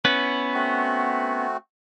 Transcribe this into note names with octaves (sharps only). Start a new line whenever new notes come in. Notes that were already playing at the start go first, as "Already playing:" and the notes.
B3 C#4 E4 B4
A3 C4 F#4